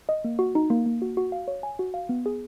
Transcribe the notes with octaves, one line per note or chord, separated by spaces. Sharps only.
D#5
A#3
F#4
D#4
A#3
A#3
F#4
F#4
F5
C#5
G#5
F#4
F5
B3
G#4